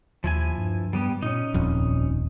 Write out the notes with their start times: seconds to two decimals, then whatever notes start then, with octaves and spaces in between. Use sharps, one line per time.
0.24 D#2 F3 E4 G#5
0.58 G2
0.93 G3 B3 G4
1.22 A#2 C#4 D#4
1.54 D#1 A#1 F2 A#2